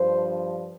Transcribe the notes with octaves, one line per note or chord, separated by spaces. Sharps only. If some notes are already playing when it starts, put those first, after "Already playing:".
Already playing: G2 F3 C5